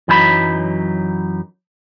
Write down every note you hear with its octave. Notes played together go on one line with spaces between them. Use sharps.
F#2 E3 F#3 D#4 G4 B5